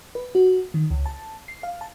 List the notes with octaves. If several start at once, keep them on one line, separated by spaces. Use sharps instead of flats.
B4
F#4
D#3
C#2
A5
C7
F5
A5